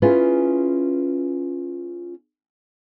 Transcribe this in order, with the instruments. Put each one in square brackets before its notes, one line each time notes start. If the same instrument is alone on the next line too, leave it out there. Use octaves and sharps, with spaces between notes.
[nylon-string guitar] C#4 E4 F4 G#4 B4